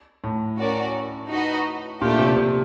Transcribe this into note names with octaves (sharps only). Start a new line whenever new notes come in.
A2
C#4 F#4 A#4 D5
D#4 F#4 B4 D#5
A#2 A3 D4 G4
C3
C3